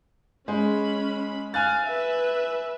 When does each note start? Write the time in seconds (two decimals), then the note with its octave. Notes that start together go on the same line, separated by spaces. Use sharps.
0.48 G#3 C#4 B5
1.54 F5 G#5 F#6 A6
1.86 B4 E5